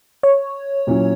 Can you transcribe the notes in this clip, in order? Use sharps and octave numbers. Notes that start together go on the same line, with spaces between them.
C#5
A#2 F#3 C#4 E4